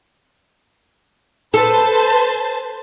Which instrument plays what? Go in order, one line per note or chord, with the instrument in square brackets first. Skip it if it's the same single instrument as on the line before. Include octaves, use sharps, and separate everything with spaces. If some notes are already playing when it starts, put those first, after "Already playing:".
[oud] A4 [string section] B4 C5 A5